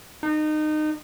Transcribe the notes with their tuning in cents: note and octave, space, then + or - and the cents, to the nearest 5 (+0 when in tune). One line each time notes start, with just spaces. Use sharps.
D#4 -25